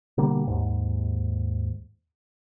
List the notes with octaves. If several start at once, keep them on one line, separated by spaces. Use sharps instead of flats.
B2 D3 G3 A#3
D#2 G#2